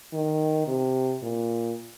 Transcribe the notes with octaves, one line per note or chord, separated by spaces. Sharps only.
D#3
C3
A#2